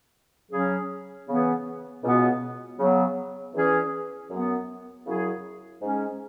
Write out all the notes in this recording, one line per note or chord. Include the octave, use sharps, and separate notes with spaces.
C#3 F#3 C#4 G#4
C#3 E3 B3 G#4
C#2 B2 B3
C#3 F#3 B3
E2 E3 C#4 G#4
F#2 F#3 B3
F#2 C#3 F#3 E4 G#4
G#2 G#3 C#4 G#4